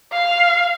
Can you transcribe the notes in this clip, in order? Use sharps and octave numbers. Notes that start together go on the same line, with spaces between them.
F5